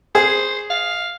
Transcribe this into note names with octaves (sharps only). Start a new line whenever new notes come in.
G#4 C5
F5